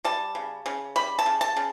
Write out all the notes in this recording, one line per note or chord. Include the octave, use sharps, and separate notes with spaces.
G3 A5
C#3
C#3
G3 B5
A5
C#3
A5
C#3